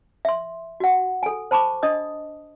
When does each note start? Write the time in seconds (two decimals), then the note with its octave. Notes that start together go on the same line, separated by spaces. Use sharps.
0.25 E5 C6
0.80 F#4 F#5
1.23 A4 G#5
1.51 C5 A5 B5 C#6 D6
1.83 D4 D#5 D#6